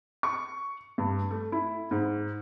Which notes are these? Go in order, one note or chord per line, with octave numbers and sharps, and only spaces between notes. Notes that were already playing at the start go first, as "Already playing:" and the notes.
C#6
G2
A3
E4
G#2